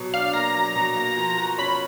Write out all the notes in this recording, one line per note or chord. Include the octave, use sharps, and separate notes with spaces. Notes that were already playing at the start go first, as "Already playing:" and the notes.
Already playing: B2 F#3
D4 F5
A#3 A#5
F#3
B2
A#3
F3
F#4
C#4 B5